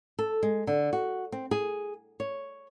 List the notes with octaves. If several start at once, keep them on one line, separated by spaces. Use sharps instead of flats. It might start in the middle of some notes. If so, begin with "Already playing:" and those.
A4
G#3
D3
F#4
C4
G#4
C#5